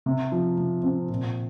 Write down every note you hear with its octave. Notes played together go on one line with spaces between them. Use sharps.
C3
F3
C3
C4
A#2